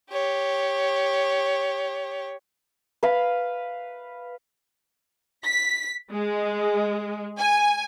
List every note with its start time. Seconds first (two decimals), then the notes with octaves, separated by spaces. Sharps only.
0.11 G4 C#5
3.03 B4 F5 B5
5.45 B6
6.11 G#3
7.38 G#5